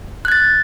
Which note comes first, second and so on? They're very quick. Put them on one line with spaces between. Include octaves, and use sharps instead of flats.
F#6 G#6 A6